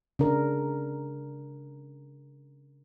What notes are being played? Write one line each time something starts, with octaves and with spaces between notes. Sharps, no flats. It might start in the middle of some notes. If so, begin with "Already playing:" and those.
C#3 D4 A#4